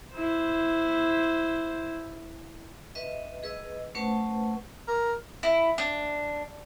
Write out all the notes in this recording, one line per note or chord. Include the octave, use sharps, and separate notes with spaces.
E4 C5
B4 D#5 E5
G#4 B4 D#5 E6
A3 C#4 B4 C5 F#5 A5
A#4
E4
D4